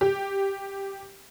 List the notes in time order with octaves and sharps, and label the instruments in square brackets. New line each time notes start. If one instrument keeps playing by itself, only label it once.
[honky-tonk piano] G4